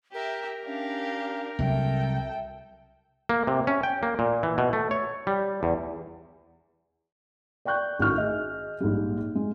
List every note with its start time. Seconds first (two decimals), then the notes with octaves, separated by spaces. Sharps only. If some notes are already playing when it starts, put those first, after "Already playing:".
0.14 G4 A#4 E5
0.65 C#4 D4 G4 F5
1.59 C2 F#3 A4 E5 G5
3.29 A#3
3.47 C3
3.67 C#4
3.83 G5
4.03 A#3
4.19 A#2
4.43 E3
4.58 B2
4.73 A3
4.91 C#5
5.27 G3
5.63 E2
7.65 D5 G5 C#6 F#6 G6
7.99 A1 D#3 F#4 C#6 F6
8.18 G#4 D#5
8.80 A#1 G#2 G3
9.35 G#3